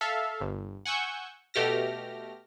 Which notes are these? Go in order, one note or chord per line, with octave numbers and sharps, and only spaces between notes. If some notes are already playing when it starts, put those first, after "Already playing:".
A4 E5 F5
G1
F#5 G#5 C#6 E6 G6
B2 A3 G4 F6 A#6